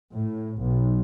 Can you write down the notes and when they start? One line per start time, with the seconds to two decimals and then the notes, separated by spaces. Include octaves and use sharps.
0.16 A2
0.60 B1